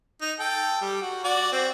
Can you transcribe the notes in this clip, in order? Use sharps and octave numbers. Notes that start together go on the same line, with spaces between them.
D#4
A4 G5
G3
F#4
F#4 D5
C4 F#4